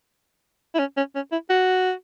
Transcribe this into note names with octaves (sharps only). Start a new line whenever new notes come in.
E4
C#4
C#4
C#4
E4
F#4